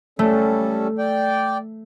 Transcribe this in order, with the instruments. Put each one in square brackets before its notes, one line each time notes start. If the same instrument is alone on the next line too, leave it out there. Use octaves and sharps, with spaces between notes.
[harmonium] G3 C#4 A4 [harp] A3
[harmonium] D5 G5